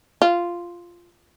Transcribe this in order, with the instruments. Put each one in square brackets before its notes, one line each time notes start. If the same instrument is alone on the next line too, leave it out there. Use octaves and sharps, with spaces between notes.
[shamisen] F4